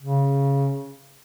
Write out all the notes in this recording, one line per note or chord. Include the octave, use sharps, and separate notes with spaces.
C#3